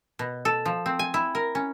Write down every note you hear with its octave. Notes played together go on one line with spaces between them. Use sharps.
B2
A4
F3
C4
G#5
E4
A#4
C#4